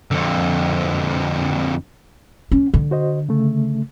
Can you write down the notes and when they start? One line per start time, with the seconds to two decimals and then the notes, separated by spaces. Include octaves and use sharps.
0.11 F2 D3
2.52 C#4
2.74 D3
2.91 F#4 C5 D#5
3.29 C#3 A3